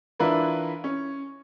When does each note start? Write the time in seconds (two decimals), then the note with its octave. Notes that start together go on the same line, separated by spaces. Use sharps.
0.20 E3 D4 E4 F4 A#4 B4
0.84 C#4